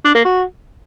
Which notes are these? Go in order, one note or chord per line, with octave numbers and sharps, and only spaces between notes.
D4
A#3
F#4